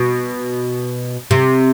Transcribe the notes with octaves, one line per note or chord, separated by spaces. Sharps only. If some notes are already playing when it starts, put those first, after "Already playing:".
Already playing: B2
C3